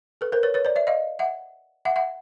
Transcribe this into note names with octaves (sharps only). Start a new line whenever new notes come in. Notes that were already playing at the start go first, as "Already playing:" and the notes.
A4 B4
A#4 C5
B4 C#5
B4 C#5
C5 D5
D5 E5
D#5 F5
E5 F#5
E5 F#5
E5 F#5